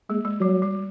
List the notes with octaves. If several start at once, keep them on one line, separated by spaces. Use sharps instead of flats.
G#3 A#3
G#3
F#3 G3
G3